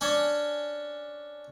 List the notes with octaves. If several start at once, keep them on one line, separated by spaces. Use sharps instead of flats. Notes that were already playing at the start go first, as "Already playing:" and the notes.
C#4 D4 C#5